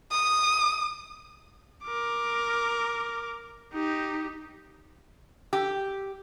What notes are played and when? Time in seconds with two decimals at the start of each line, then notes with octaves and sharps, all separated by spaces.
0.11 D#6
1.84 A#4 D6
3.73 D#4 G4
5.53 G4